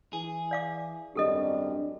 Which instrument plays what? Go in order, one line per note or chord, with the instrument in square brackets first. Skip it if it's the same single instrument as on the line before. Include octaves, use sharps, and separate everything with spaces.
[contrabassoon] E3 [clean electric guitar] G#4
[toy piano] D5 F5 D6
[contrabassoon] G#1 [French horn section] F#2 G3 D4 [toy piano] G4 A4 D#5